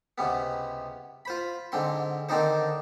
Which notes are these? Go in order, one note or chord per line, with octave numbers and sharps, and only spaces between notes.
C#2 C3 B3
F4 C5 B5
G#2 D3 C4 C6
D3 D#3 C4 D4 D#4 C5